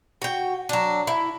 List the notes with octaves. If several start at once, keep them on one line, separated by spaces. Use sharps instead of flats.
F#4 G5
F#3 D4
E4